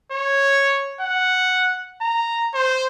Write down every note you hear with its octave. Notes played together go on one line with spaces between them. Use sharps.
C#5
F#5
A#5
C5